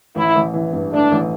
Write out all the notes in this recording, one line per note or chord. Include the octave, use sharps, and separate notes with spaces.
A1 E4
A1
E3
G2
A3 D4
A1